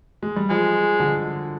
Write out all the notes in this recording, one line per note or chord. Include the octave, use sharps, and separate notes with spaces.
G#3
G3
F3 G#3
D3